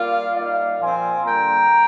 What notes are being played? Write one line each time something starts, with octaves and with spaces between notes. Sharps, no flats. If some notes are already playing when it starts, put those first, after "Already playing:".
Already playing: G3 A#3 F4 D5 F5
G3 A#3 D#4 D5 F5
A#2 F3 C4 F4 G#5 C6
D3 G3 A#3 G5 A#5